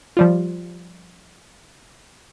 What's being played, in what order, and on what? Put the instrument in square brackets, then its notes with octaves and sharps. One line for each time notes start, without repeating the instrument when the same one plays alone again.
[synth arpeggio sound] F3 G3 F4